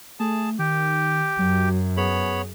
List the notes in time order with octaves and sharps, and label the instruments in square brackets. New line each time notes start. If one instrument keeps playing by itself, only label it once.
[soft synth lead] A3 [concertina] G#4 A5
[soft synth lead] D#3 [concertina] G4
[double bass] F#2 [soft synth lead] F#3
[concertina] B3 C#5 B5 [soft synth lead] G#4